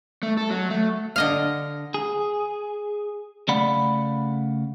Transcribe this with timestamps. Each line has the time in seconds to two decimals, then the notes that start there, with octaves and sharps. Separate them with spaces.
0.23 A3
0.37 A4
0.50 F#3
0.70 A3
1.16 D3 D#5 F5
1.94 G#4
3.48 C#3 A3 D5 F5 F#5 B5